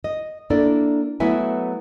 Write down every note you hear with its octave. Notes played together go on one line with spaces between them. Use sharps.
D#5
A#3 D4 E4 A4 D5
F#3 A3 B3 E4 E5 G#5